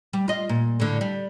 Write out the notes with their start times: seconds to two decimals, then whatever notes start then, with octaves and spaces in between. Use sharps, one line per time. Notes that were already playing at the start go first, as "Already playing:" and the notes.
0.13 G3
0.28 F4 D#5
0.49 A#2
0.80 A2 D3
1.01 G3